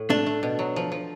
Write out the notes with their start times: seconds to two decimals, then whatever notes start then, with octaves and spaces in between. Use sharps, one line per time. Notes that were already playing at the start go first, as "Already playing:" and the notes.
Already playing: A2
0.10 A3 D4
0.26 A3
0.43 B2
0.59 F#3
0.76 F3
0.92 F3